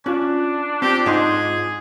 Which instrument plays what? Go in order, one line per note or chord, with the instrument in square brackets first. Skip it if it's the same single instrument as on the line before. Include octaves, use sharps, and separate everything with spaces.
[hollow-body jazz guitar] C#4 [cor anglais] D4 [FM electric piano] F4 F#6
[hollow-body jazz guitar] C4 [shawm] G4
[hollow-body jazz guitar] G#2 D#4 C6 [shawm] G#4